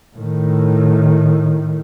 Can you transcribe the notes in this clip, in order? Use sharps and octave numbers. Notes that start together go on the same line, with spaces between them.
A2 D#3